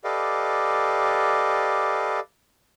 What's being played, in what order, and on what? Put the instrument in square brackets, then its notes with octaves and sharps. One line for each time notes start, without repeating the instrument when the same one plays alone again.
[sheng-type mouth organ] G4 A4 B4 D5 D#5 F5